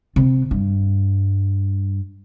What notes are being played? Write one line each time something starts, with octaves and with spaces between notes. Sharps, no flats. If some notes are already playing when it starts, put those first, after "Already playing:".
C3
G2